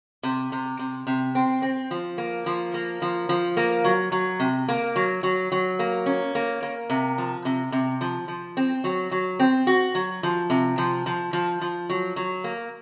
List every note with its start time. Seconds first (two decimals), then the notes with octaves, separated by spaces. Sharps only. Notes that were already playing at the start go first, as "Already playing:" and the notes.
0.23 C3
0.52 C3
0.79 C3
1.07 C3
1.35 C4
1.62 C4
1.91 F3
2.18 A#3
2.46 F3
2.74 A#3
3.02 F3
3.29 F3
3.57 A#3
3.84 F#3
4.12 F#3
4.40 C3
4.68 A#3
4.96 F#3
5.23 F#3
5.52 F#3
5.79 A#3
6.06 C#4
6.35 A#3
6.62 A#3
6.90 C3
7.18 F3
7.45 C3
7.72 C3
8.01 F3
8.28 F3
8.57 C4
8.84 F#3
9.11 F#3
9.39 C4
9.67 F#4
9.95 F#3
10.23 F3
10.50 C3
10.78 F3
11.06 F3
11.33 F3
11.61 F3
11.89 F#3
12.16 F#3
12.44 A#3